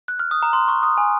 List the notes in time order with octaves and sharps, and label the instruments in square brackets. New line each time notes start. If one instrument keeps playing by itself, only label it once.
[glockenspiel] F#6
F6
D#6
A#5
C6
C#6
D#6
G#5